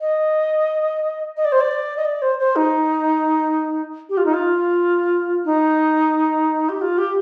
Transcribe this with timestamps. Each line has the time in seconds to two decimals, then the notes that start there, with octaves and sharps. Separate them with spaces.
0.01 D#5
1.37 D#5
1.45 D5
1.52 C5
1.61 D5
1.97 D#5
2.05 D5
2.22 C5
2.39 C5
2.56 D#4
4.09 G4
4.17 F4
4.26 D#4
4.34 F4
5.45 D#4
6.69 G4
6.81 F4
6.98 G4